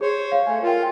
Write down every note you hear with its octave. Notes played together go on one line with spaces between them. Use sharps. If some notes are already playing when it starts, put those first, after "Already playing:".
G#4 C5 C#5
F5
A3 G#5
F4 A#4 G5